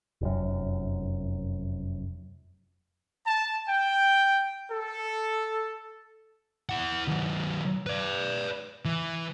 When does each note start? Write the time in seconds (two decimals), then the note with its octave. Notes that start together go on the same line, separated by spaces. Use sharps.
0.21 F1 F#2
3.26 A5
3.69 G5
4.69 A4
6.69 E4 F#5
7.08 D#3 F#3
7.86 B4 D5
8.85 E3